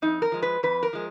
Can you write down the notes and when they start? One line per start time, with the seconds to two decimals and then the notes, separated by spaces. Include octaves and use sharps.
0.02 F2 D#4
0.22 A#4
0.32 F3 G#3
0.42 B4
0.63 F2 B4
0.83 A#4
0.93 F3 G#3